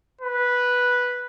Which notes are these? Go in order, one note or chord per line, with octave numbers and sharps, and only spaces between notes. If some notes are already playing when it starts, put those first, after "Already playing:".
B4